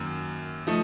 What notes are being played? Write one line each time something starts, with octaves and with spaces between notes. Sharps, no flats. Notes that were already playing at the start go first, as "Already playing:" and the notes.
Already playing: F#2 D#3 F#3 A#3
F3 A3 D#4